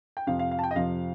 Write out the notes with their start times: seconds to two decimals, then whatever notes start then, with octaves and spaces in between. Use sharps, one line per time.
0.17 G5
0.27 F2 C3 F3 F5
0.39 F5
0.51 F5
0.59 A5
0.64 G5
0.71 D#5
0.76 F2 C3 F3 F5